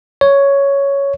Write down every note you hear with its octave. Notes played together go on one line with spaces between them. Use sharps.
C#5